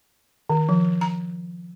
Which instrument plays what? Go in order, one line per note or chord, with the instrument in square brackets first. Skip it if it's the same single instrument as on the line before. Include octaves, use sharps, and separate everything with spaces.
[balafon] D#3
F3
A#5